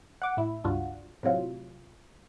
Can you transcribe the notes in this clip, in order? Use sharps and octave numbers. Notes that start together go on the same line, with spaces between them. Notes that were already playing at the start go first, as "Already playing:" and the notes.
F#5 D6
A2 E4
C#2 G2 D4 F4 F#4
A2 C3 F#3 F4